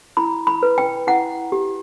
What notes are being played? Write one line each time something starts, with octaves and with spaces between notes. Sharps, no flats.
E4 B5
B5
B4
G5
E4 F#5
G4